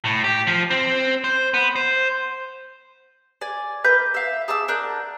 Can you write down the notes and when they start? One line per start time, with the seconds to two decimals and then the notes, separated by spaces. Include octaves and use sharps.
0.05 A2
0.24 G4
0.47 F3
0.71 C4
1.24 C5
1.54 B3
1.76 C5
3.41 D5 G#5
3.84 A#4 B4 G6
4.14 E5 F5
4.48 G#4 A5 D6 E6
4.68 D4 A#4 F#5 G6